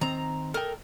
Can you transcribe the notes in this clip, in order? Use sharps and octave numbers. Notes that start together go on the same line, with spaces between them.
D#3 C4 A#5
A4 A#4 D#5 G5